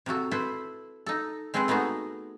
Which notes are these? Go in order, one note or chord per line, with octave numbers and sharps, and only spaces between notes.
C3 A#3 F#4 A4
E4 A4 B4 C5
D#4 A4
G#3 C4 G#4 A4 B4
A3 B3 D#4 F#4 G#4